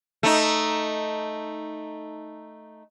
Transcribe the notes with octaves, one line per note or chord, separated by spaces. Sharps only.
A3 D#4